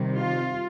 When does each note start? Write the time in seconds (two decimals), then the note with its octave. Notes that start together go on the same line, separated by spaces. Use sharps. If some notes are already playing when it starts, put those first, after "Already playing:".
Already playing: C3 D#3 G3
0.13 F4